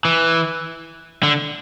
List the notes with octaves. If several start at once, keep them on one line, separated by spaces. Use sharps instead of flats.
E3
D3